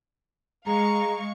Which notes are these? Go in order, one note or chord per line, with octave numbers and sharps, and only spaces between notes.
G#3 G#4 F5 A#5 C#6